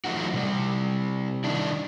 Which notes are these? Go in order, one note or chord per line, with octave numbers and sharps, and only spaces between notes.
E3 F#3 A3 D#4 F4 F#4
C3 G3
D#3 D4 E4